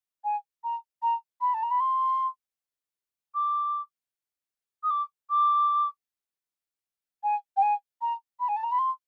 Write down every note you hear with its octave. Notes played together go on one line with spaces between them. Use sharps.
G#5
A#5
A#5
B5
A5
A#5
B5
C6
D6
D#6
D6
D6
G#5
G5
G#5
A#5
B5
G#5
A5
A#5
B5
C6